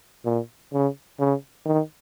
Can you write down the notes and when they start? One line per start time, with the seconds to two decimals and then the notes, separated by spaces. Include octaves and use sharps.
0.25 A#2
0.73 C#3
1.19 C#3
1.66 D#3